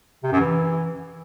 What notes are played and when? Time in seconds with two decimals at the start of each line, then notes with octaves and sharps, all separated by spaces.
0.23 C3
0.32 F#2
0.41 E3